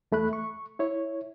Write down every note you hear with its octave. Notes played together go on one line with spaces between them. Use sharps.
E2 A3 B5 F#6
C#6
E4 C#5